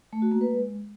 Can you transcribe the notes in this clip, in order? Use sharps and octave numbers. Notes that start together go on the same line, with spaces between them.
A3
F#4
A#3
B4
G#3